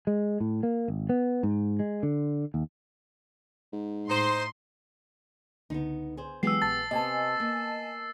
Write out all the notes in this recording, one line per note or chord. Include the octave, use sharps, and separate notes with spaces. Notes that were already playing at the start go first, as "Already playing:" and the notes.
G#3
A2
A#3
G#1
B3
G#2
G#3
D3
D#2
G#2
A2 D#4 C5 C6
C#2 D3 B3 D#4
G#4 C5
E3 F#3 G#3 B3 G4 G#4 E6 C7
A#1 A5 A6
C3 B3 D#5 G#5 A5
A#3